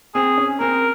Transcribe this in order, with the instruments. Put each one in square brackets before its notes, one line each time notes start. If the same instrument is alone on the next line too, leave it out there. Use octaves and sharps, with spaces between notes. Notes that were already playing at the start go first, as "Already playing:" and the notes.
[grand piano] C4 [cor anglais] G#4
[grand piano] C#4
[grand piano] C4 [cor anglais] A#4